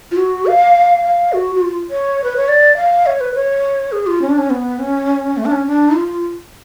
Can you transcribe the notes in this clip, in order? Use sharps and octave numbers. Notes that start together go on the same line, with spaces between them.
F4
F#4
F5
F5
F#4
F#4
F4
C#5
B4
C#5
D5
F5
C#5
B4
C#5
G#4
F4
C#4
D4
C#4
B3
C#4
A3
D4
C#4
D4
F4